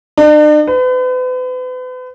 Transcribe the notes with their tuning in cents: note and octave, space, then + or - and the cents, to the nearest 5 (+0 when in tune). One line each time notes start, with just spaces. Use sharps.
D4 +45
B4 +40